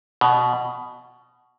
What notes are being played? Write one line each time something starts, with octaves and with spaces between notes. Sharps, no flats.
B2